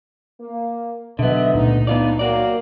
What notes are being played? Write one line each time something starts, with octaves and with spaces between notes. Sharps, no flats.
A#3
B2 D3 D#3 F#3 B3 C5 D#5 E5
C#2 A#2 A3 D#4
G#2 B3 D4 D#4 F4 D5
D#3 F#3 A#3 F#4 D5